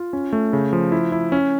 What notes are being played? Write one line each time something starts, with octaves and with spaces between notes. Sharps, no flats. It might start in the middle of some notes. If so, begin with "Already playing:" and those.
Already playing: F4
C#4
A3
C#3
F3
E4
E4
C#4